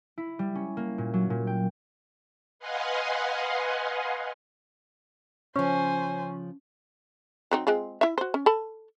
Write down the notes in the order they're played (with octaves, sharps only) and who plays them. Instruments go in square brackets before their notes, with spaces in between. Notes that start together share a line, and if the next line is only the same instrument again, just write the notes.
[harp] E4
G3
C#4
A#3
A#2
F#3
A#2
G5
[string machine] B4 D#5 F5 F#5 G#5 C6
[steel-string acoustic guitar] C#3 F3 [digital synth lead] C#4 [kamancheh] C5 G#5
[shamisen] F#3 C4 D#4
G#3 C4 F4
E4 E5
F#4 C5
C#4
A4 A5 B5